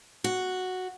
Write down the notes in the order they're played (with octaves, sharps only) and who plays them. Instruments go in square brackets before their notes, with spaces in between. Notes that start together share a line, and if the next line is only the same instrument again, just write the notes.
[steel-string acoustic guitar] F#4